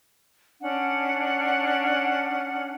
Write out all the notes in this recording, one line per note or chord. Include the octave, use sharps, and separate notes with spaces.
C#4 D4 F#5